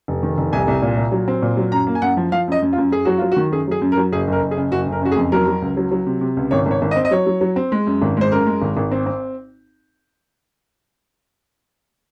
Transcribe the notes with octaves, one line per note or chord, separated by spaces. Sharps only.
F1
D#3
F1
C2 G#5
C2
A#2
A#2
F#3
C4
A#2
F#3
F#2 A#5
A#3
G#5
F#2 F#5
F3
F3 F5
F#2 D#5
F#2
F4
F#2
F#2 G#4
F#3 F#4
F#3 F4
F#4
D#3
F#2 G#4
F#3 G#4
F#2
A#4
F#3
F#1 G#4
F#1 A#4
F#1
G#4
C#3
F#1 F#4
F#1
A#4
C#3 F#4
G#4
F2
F#3 A#4
F#3
C#2
F#3
F#3
C3
C3
C#2
G#1 C#5
G#1
C#5
G#1
D#5
C4
D#5
F#3 C#5
F#3
F#3
C4
G#3
F#2
G#1
G#3 C5
F#2 A#4
G#3
G#1
G#1
C4
C4